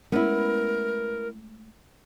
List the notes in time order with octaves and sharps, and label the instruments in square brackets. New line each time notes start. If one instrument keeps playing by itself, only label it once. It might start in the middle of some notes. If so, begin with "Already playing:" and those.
[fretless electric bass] G#3 A3 C#4 [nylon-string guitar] B3 E4 [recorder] A#4